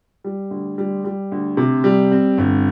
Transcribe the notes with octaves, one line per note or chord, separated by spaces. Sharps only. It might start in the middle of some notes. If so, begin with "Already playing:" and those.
G3
D2
G3
G3
D2
C3
G3
C4
G1